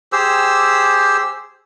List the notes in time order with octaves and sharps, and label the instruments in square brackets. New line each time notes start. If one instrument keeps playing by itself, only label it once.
[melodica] G4 G#4 C5 E6